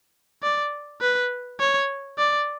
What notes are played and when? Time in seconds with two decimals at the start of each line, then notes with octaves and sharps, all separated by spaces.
0.43 D5
1.01 B4
1.60 C#5
2.18 D5